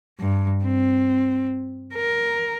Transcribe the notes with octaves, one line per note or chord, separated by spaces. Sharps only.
G2
C4
A#4